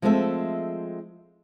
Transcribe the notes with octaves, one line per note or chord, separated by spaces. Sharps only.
F3 G#3 A3 C4 A4 E5